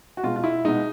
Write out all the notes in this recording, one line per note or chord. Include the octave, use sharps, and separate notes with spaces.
F#4
B2 G#3 F4
F4
E4
B2 G#3 D#4